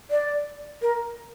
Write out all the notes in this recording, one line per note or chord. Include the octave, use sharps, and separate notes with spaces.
D5
A#4